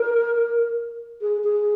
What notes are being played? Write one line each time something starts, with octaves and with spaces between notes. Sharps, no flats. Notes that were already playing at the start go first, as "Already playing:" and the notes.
Already playing: A#4
G#4
G#4